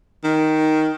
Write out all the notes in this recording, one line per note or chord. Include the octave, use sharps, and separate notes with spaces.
D#3